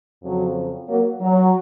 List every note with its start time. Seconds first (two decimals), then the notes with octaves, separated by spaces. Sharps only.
0.22 F2 C#3 F3 F#3
0.87 F#3 A#3
1.20 F#3